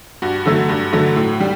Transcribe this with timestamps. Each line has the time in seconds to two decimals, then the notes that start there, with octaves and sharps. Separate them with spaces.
0.22 G2 F#4
0.45 D3 F#3 A3
0.69 G2
0.93 D3 F#3 A3
1.16 A2
1.40 G3